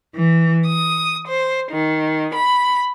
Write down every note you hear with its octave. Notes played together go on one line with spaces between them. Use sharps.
E3
D#6
C5
D#3
B5